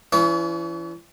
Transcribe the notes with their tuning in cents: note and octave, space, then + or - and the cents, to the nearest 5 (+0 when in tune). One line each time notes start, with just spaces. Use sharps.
E3 +30 D4 -45 C#6 +40